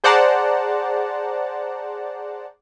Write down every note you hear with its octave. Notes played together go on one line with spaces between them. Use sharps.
G#4 C5 D5 F#5 A5 A#5